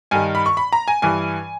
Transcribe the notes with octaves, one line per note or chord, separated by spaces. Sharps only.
G2 D#3 G#5
B5
C#6
B5
A#5
G#5
G2 E3 G#5